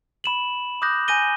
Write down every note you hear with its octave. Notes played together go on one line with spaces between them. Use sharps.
B5 E7 F#7
D6 D#6 F#6 G6 A#6
G#5 G6 A#6 D#7 G7